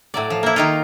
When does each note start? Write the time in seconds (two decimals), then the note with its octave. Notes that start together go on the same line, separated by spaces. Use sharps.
0.14 A2 F#3 D5
0.30 F3
0.43 A#3 E4
0.56 D#3 D#4 F4